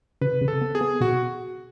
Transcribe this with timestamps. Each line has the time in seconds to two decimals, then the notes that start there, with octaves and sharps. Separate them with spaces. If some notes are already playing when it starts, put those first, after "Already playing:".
0.21 C#3 B4
0.42 C#3
0.48 A4
0.61 B3
0.75 G#4
0.81 B3
1.01 B2 F#4